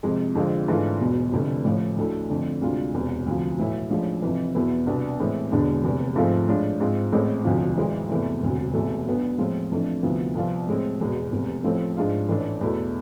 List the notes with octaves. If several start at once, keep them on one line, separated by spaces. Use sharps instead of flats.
F2 C3 G#3
F2 D3 G#3 C4 F4
G#2 E3 A3 D4 F4
E1 E2 B2
F1 F2 D3 A3
A1 A2 F3
D2 D3 A3 E4
F2 D3 A3
D2 C3 G#3 D4 F4
E1 E2 C3
D2 C3 F3
B1 A2 E3 A3 E4
A1 A2 F3 G#3 D4
F2 C3 E3
E2 B2 B3 E4
C2 B2 B3 D4
A2 E3 G#3 C4
E1 E2 D3 G#3 D4
F1 E2 C3
G#2 F3 A3 C4 F4
A2 G#3 D4 F4
G#2 G#3 C4 F4
A1 A2 G#3 C4
E1 D2 C3 F3
G#1 G#2 E3 G#3
E2 C3 E3 A3
E1 D2 C3
E1 E2 C3 E3 A3
B1 B2 B3 D4
A2 F3 G#3 C4 F4
F2 E3 A3 D4
D2 C3 F3 B3 E4
C2 C3 F3 B3 F4
A2 G#3 C4
E1 E2 B2 G#3
F1 E2 C3
A1 A2 F3 A3 C4
G#2 G#3 D4 F4
A1 A2 E3 A3 D4
E2 B2 A3 E4